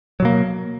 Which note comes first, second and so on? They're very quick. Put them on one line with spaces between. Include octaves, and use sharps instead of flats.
F#3 B2 A#3